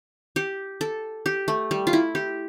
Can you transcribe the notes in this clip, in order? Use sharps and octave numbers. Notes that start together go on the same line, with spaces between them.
G4
A4
G4
A3
G3
F4
E4
G4